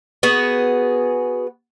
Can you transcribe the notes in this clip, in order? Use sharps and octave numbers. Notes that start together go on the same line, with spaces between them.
B3 F#4 G#4